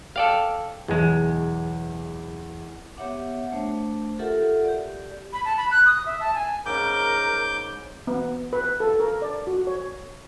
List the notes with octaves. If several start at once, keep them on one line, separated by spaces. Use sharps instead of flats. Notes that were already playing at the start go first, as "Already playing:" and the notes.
A4 D5 F5 G5
B1 E2 G#3
B3 G4 C#5 E5 F#5 D6
A3 D4 C5
F4 G4 A4 A#4 E5 F#5
G4 D5
B5
A5
B5
F#6
D#6
E5
A5
G#5
G#2 C#3 A#4 D6 G6
B3
B4
A4
A#4
D5
F#4
C#5